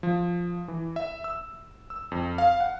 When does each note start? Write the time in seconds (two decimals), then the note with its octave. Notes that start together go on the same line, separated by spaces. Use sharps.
0.03 F3
0.68 E3
0.96 E5
1.24 E6
1.90 E6
2.12 F2
2.38 F5
2.60 F#5